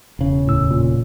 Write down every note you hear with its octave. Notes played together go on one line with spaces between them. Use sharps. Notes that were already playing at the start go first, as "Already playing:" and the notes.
E1 C#3
D2 A2 E6
A#2